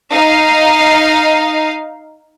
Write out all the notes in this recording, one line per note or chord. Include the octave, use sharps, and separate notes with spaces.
D#4 F5